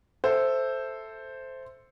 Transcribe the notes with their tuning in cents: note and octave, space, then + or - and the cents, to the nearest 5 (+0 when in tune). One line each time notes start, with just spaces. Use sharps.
A4 +0 C5 +0 E5 +0